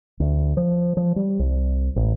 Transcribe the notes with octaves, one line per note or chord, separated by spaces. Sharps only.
D2
F3
F3
G3
C2
A1